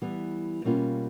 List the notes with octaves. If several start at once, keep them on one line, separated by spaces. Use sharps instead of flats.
E3 G3 B3
B2 G3 A#3 C#4 F4